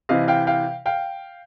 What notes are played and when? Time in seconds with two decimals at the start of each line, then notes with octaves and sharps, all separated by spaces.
0.09 C3 E3 D#5 F5
0.28 F5 G5
0.47 F5 G5
0.86 F5 G5